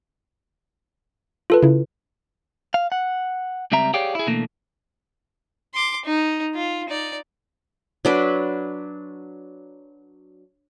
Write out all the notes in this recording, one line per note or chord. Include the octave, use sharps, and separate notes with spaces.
F4 A4 B4
C#3 E4
F5
F#5
C#2 G3 C4 E5 A#5
G4 G#4 C#5 D5 F5 G5
E4 G#4
B2 D3 E3 A3 A#3
C6 D6
D#4
F4
D#4 D5
F#3 D4 B4